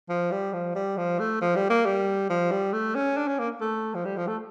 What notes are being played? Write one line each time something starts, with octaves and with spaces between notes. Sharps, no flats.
F3
G3
F3
G3
F3
A3
F3
G3
A#3
G3
F3
G3
A3
C#4
D4
C#4
A#3
A3
F3
G3
F3
A3